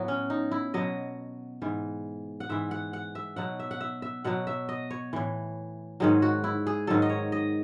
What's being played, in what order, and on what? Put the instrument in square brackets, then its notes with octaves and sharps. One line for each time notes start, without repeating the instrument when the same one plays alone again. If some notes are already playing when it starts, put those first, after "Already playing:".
Already playing: [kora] A2 F#3 B3
C#4
D#4
E4
B2 F#3 D#5
G#2 E3
F#5
G#2 E3 E5
F#5
F#5
E5
B2 F#3 F#5
E5
F#5
E5
E5
B2 F#3 F#5
E5
D#5
C#5
A2 E3
G#2 D#3 F#3 G#4
F#4
E4
G#4
G#2 D#3 F#3 A4
D#5
C#5
D#5